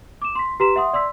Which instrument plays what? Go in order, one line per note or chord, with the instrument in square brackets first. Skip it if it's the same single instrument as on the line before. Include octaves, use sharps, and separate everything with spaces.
[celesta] D6 E7
C6 B6
G4 B4 A#5 C6 B6 E7
E5 F#5 C6 D#6
D5 C6 E6 B6